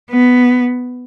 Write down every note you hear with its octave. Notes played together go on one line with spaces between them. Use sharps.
B3